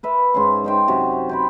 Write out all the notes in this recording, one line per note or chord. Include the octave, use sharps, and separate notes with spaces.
A#4 B4 E5
G#2 C#4 C6
D#4 C5 G5
F#2 C3 F#4
C5 G5 B5